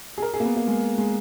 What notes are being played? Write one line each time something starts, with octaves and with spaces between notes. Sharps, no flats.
G#4
A#4
G#4
A#3
B3
A#3
G#3
G#3